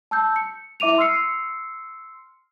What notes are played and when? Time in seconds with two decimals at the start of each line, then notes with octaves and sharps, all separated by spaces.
0.11 A5 E6 G6
0.36 C#7
0.80 E4 E5 D6 D#7 F7
0.98 C6 E6 F6 C7 C#7